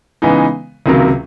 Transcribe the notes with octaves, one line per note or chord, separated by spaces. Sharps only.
C#3 E3 G#3 B3 D#4
C#2 C3 D#3 F#3 A#3